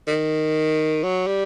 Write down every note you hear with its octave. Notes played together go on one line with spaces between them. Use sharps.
D#3
F#3
G3